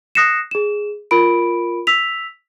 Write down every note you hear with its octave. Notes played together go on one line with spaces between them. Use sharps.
D#6 F#6 A#6 C7 C#7 E7
G#4 E7
F4 A#4 B5 D7
E6 B6 F7